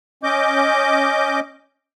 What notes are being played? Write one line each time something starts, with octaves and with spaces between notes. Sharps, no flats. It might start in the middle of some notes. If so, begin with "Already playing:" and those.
C#4 D#5 D6 G6